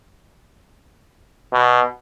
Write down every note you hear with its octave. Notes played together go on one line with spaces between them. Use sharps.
B2